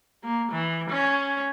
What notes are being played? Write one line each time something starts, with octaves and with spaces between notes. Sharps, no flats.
A#3
E3
C#4